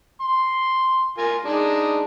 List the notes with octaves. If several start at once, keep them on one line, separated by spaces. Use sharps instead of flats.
C6
F4 A#4 G#5
G#3 D4 D#4